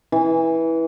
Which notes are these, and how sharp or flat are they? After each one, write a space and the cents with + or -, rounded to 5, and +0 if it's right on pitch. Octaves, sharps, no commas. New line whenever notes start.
E3 -10